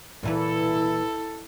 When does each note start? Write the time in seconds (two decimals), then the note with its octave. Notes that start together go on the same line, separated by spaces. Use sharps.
0.23 A#2 E3 E4 A4 B4